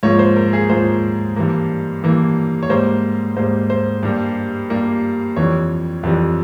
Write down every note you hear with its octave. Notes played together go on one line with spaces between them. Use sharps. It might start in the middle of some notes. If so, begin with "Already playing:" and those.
G#2 F3 A#3 C#5
C5
A#4
G#4
G#2 F3 A#3 C5
G2 E3 A#3
G2 E3 A#3
C#5
G#2 G3 A#3 C5
G#2 G3 A#3 C5
C5
G2 G3 A#3
G2 G3 A#3
F2 E3 G3 C#5
F2 E3 G3